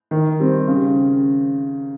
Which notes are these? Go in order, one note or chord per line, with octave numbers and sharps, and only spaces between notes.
D#3
G3 C4
C#3